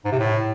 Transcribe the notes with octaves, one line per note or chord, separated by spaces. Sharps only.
G#2
C3
A2